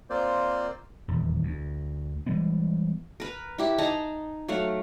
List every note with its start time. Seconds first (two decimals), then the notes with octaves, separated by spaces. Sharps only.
0.10 A#3 C4 F4 C5 D5
1.08 D#1 E2
1.43 D2
2.26 E3 G3 G#3 B3
3.20 A#4 B4
3.58 E4 G4 E5
3.78 D#4 G#4 A5 A#5
4.48 F#3 A3 F5 F#5